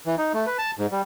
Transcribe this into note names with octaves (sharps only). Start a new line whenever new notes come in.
E3
D#4
A3
B4
A5
G#2
G3